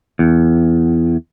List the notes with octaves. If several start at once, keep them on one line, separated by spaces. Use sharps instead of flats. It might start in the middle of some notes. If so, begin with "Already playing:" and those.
E2